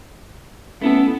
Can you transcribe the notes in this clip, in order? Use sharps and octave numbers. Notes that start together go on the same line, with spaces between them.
A3 B3 C#4 E4 A4